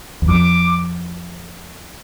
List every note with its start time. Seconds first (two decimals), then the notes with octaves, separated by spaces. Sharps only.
0.22 E2
0.28 F2 D6